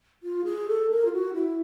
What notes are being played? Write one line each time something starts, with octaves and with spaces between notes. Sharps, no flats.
F4
G#4
A4
A#4
F4
F#4
E4